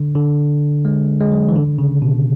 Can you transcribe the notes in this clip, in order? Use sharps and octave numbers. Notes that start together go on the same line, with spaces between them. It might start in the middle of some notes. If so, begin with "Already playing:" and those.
Already playing: D3
D3
G#3
G#3
F#3
E3
D3
C#3
B2